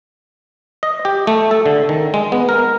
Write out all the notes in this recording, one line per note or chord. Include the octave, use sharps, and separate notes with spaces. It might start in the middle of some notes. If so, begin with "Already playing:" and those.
D#5
G4
A3
A4
D3
D#3
G#3
B3
A#4